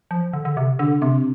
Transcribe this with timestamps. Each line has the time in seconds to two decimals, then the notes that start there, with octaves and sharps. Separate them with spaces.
0.11 F3
0.33 D3
0.45 D3
0.57 C3
0.79 D3 D4
1.02 C3 C4